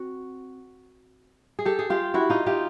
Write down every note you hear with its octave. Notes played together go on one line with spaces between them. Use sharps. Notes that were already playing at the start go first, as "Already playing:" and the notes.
Already playing: C4 F#4
G#4
G4 A4
G#4
F4 G4
E4 F#4
D#4 F4
F4 G4